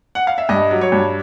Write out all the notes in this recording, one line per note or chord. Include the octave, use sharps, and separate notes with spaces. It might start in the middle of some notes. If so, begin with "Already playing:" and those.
F#5
F5
E5
G2 D#5
F#3
C#5
G2